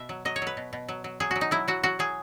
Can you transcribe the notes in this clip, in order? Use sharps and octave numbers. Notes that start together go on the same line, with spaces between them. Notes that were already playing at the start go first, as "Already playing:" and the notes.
Already playing: B2 E5
F#3
F#3 D#5
C#5
F#3 B4
B2
B2
F#3
F#3
F#3 G#4
F#3 F#4
D#4
F#3 E4
F#3 F#4
F#3 F#4
F#3 G#4